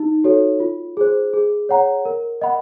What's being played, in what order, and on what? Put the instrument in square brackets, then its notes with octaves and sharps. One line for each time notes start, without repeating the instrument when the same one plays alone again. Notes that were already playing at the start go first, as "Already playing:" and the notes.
Already playing: [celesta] D#4
F#4 A4 C#5
F4
G#4 C5
G#4
C#5 F#5 A#5
A#4
D#5 F#5 B5